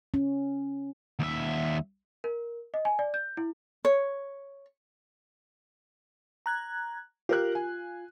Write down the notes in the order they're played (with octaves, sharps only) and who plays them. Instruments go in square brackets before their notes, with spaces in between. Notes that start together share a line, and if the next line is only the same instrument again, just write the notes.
[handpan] C#4
[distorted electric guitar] D#2 E5
[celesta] A#4
D#5
G#5
D5
G6
E4
[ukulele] C#5
[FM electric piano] A#5 F#6 G#6
[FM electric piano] F4 [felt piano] G4 A#4 F#6
[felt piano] G#5